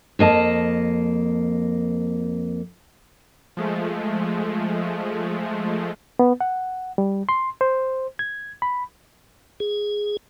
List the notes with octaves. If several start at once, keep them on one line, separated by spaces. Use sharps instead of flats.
F2 A#3 D#5 A5
F3 G#3 A3
B3
F#5
G3
C6
C5
G#6
B5
G#4